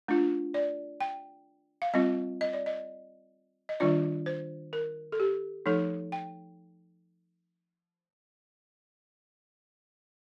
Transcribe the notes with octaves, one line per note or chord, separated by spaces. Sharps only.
A3 D4 F4
D5
G5
F5
G3 C4 F4 D#5
D#5
D5
D#5
D#5
D#3 G3 D4 F4 D5
C5
A#4
A4
G4
F3 A3 D#4 A4
G5